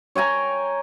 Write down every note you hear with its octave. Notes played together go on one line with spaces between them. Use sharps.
C#5 G5 G#5 A#5